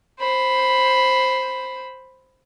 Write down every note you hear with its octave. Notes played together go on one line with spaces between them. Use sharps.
C5 B5